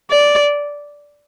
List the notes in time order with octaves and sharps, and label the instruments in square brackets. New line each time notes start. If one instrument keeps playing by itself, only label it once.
[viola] D5